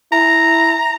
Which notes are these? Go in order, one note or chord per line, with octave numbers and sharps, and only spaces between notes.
E4 A#5